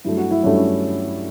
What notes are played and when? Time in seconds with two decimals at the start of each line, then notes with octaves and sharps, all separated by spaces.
0.05 G2 F#3 A3 E4
0.17 F#4
0.31 E4
0.43 G2 F#3 A3 C#4
0.57 C#4